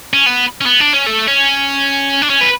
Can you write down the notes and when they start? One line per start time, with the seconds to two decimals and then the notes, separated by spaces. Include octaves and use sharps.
0.13 C#4
0.26 B3
0.61 C#4
0.66 B3
0.80 D4
0.93 C#4
1.06 A3
1.27 C#4
2.22 D4
2.30 C#4
2.41 B4